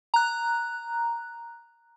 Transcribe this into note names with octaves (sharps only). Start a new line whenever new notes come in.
A#5 F#6